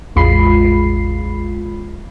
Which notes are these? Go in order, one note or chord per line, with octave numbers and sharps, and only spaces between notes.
A1 E2 G#3 F4 B5 C7